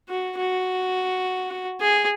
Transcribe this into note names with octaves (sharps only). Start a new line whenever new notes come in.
F#4
F#4
G#4